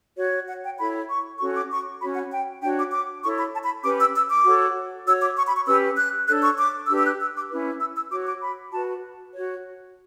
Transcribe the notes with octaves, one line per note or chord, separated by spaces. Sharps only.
F#4 C#5
F#5
G5
E4 A4 C#5 B5
C#6
C#4 F#4 A4 C#5 C#6
D6
C#6
C#4 F#4 C#5 B5
F#5
G5
D4 F#4 C#5 G5
D6
D6
E4 A4 C#5 C#6
B5
A5
B5
C#4 G4 B4 D6
E6
E6
D6
F#4 A4 C#5
F#4 C#5 E6
D6
C#6
B5
C#6
C#4 G4 B4 E6
F#6
D4 A4 C#5 F#6
C#6
D6
D4 G4 B4 E6
E6
F#6
E6
D6
C#4 E4 B4
E6
E6
F#4 C#5 D6
D6
B5
F#4 B4 A5
F#4 C#5